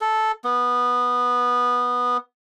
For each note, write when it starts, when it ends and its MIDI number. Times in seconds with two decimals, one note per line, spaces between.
0.01 0.32 69
0.44 2.17 59